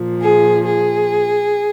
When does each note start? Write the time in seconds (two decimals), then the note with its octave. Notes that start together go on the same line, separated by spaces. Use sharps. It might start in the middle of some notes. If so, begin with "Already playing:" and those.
Already playing: A#2 F3
0.21 G#4
0.66 G#4